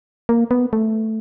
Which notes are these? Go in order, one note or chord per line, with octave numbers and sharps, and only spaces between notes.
A#3
B3
A3